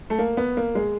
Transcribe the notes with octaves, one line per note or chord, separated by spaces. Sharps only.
A3
A#3
B3
A#3
G#3